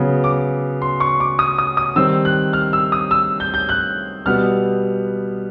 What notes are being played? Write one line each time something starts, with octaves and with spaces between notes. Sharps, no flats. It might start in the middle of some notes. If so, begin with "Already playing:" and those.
Already playing: C#3 F#3 B3
D6
C6
C#6
D6
D#6
D#6
D#6
D#3 G3 C4 E6
F#6
F6
E6
D#6
E6
G6
G6
F#6
B2 G3 B3 F6